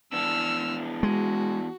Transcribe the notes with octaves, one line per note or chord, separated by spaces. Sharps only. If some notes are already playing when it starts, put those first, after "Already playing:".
E3 B3 D4 E6 F6
G#3 F#4